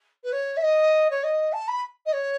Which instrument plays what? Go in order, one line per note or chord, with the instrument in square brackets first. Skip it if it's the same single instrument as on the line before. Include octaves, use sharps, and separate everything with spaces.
[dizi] B4
C#5
E5
D#5
C#5
D#5
A5
B5
D#5
C#5